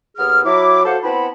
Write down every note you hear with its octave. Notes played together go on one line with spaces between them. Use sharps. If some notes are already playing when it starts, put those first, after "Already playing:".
D#2 B3 G#4 F6
F#3 E4 D6
F#4 A4 C5 F5 F#5
B3 C4 E4 F#5 A5 B5